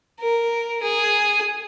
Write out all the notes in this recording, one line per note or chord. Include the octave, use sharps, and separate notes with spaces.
A#4
G#4